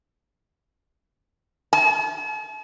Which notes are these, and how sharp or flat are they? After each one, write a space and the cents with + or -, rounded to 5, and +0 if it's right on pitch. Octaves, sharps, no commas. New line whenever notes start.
A5 -45